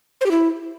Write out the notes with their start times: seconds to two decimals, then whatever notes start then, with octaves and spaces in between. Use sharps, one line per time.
0.21 C5
0.26 G4
0.31 E4